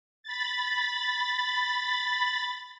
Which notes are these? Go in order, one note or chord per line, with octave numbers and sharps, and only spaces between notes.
B5 A6